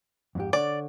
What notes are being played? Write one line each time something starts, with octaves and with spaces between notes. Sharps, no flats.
F2 G#2 G4
D3 C#5 D5